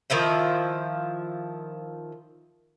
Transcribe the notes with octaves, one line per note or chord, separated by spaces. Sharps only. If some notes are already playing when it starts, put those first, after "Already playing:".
D#3 F3 E4 C5